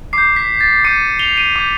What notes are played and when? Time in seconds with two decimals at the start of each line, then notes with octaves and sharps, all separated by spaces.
0.13 D6 G6 C7
0.36 B6
0.61 A6
0.85 D6 G6 C#7 D#7
1.19 F7 G7
1.37 D#7 F7
1.56 D6 G6